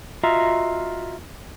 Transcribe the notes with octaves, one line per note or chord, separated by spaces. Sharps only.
F4 F#4 D#5 E5 A#5